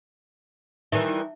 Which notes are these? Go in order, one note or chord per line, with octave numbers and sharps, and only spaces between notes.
D#3 E3 G3 D#4 E5